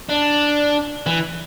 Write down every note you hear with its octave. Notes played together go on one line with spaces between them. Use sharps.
D4
E3